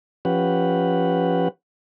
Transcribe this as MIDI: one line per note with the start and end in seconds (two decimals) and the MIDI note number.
0.25 1.48 53
0.25 1.48 61
0.25 1.48 67
0.25 1.48 71
0.25 1.48 78